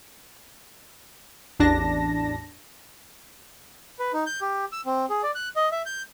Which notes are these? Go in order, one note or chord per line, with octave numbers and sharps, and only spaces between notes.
A1 E2 D4 A5 A#6
B4
D#4
G6
G4
E6
C4
G#4
D5
F#6
D#5
E5
G6